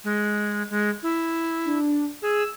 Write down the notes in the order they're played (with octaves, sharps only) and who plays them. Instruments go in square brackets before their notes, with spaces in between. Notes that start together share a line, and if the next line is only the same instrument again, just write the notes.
[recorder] G#3
G#3
E4
[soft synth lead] D4
[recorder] G#4 [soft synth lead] E6